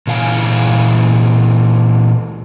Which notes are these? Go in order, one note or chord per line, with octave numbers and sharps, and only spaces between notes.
A#2 E3 F5 G#5